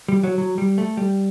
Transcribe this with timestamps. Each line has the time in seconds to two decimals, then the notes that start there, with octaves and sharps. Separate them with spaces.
0.09 G3
0.23 F#3
0.38 F#3
0.58 G3
0.78 A3
0.97 G3